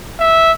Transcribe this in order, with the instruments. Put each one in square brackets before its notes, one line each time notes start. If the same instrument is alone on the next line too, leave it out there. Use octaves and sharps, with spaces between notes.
[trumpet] E5